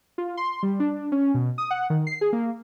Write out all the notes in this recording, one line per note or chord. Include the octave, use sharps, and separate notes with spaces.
F4
C6
G3
D4
C#4
B2
D#6
F#5
D#3
C7
G#4
A#3